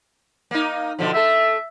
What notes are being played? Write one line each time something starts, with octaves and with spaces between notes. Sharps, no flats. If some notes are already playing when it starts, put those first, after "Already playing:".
A#3 D#4
B2 D3 F3
A3 A4 E5